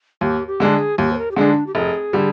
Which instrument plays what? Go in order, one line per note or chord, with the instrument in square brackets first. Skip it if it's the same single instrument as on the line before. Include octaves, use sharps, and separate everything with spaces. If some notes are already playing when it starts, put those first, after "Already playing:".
[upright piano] D#2 [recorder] G4
[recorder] G4
[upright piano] D3 G#3 D4
[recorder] G#4
[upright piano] D#2 [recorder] G4
[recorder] C5
A#4
G4
[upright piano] D3 G#3 D4 [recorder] G#4
[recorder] D#4
D4
G4
[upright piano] F1 [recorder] G#4
[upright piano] D3 G3